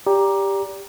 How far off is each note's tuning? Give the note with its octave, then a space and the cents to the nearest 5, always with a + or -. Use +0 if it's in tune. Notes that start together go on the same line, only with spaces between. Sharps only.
G4 +10 D5 -25 A#5 +15